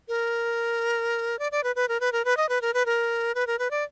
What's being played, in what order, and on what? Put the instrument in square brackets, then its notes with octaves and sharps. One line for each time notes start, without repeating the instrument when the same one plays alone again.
[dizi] A#4
D5
D5
B4
B4
A#4
B4
A#4
B4
D#5
B4
A#4
B4
A#4
B4
A#4
B4
D5